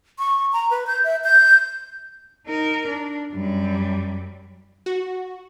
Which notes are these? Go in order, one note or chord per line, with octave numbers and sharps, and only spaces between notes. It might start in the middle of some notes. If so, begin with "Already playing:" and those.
C#6
A#5
B4
G6
E5
G6
D#4 A#4
D4
F#2 G3
F#4